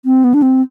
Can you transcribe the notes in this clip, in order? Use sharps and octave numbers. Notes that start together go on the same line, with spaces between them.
C4
B3
D4
C4